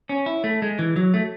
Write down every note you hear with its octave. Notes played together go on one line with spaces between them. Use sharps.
C#4
E4
A3
G#3
E3
F#3
A3